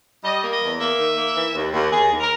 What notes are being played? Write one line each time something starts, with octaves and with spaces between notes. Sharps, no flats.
G3 D#5
A#3
D#5
E2
A#3 E5
D#3
A#3
E3
D#2
D#2
D#2 G#4
D#2
A#4